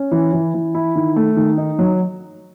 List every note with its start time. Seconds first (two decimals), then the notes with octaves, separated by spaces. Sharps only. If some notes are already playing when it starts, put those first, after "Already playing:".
Already playing: C#4
0.11 E3
0.33 E3
0.54 E3
0.75 E4
0.96 D#3
1.16 A3
1.37 D#3
1.58 D#4
1.79 F#3